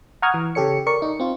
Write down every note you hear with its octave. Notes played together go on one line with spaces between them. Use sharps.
F#5 A#5 C#6 D#6 F6 G#6
E3
C#3 G4 A4 C#5 C#7
A#4 D5 C#6 C#7
D#4
C4 F4